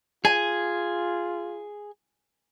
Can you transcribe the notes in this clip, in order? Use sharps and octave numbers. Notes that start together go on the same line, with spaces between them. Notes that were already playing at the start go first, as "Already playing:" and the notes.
F4 G#4 G#5